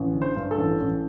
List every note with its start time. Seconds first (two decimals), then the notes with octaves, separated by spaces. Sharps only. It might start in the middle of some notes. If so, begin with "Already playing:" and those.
Already playing: A1
0.14 D3
0.22 C5
0.36 G2
0.51 A4
0.58 A1
0.80 A1